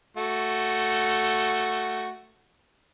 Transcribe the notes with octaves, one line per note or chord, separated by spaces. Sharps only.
A3 F#4